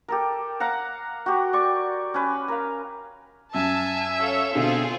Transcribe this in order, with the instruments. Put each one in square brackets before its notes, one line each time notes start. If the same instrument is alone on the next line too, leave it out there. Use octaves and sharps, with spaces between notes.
[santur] G4 A4 A#4
F5 F#5 A#5
F#4 G4
D5 C#6
C#4 B4
A#4 F5
[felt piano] F#2 [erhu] E5 [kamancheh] G#5 [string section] A5
[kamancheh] A4 F5 [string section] C#5
[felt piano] B2 D3 [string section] C4 F4 G#4